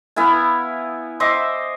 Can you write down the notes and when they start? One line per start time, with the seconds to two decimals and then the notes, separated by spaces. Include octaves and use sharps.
0.16 B3 E4 F5 G#5
1.20 C5 D#5 E5 D6